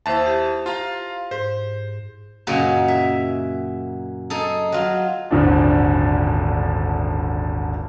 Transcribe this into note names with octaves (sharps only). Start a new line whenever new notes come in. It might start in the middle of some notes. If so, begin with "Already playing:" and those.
D#2 E4 C5 E5 A5
G4
F4 F5 A#5
G#2 C5
F#2 A#2 C#3 F#3 C#4 D#4
E5
D#4 G#4 A4
F#3 F4
D#1 G#1 D3 F3 D4